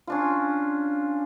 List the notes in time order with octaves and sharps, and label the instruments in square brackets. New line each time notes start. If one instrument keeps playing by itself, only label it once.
[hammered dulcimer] C#4 D4 F4